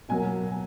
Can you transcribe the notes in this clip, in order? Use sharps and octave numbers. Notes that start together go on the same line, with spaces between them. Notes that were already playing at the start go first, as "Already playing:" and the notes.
B2 F#3 A#3 G#5